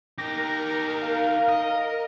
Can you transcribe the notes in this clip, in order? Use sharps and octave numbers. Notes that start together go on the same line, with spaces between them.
D#4 G4 A#4 A#6
F5
D#5